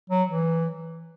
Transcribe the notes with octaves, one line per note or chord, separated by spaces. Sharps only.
F#3
E3